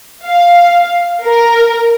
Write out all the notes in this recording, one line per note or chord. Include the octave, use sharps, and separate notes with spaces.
F5
A#4